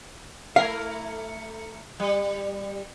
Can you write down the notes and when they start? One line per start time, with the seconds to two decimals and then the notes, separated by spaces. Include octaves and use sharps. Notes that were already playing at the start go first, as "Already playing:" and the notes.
0.56 A3 E4 A#4 F5
2.00 G3